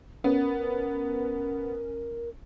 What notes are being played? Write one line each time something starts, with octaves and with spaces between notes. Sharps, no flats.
B3 C#4 A#4